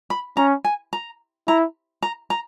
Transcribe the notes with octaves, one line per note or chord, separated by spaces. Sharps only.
B5
C#4 A#5
G#5
A#5
E4 A#5
A#5
A#5